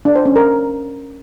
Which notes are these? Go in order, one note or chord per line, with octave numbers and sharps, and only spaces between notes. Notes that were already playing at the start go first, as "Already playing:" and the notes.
D4
C5
C#4
A#4